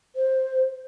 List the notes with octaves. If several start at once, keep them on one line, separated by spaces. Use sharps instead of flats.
C5